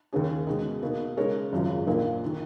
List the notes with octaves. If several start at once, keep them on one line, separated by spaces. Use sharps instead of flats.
D#2 D#3 A#3 C#4 G#4
B2 G#3 D#4
B2 A#3 D#4
C#3 G#3 D#4 A#4 C#5
G#1 F#2 C#3 F3
A#1 A#2 F3 A#3 D#4
D#3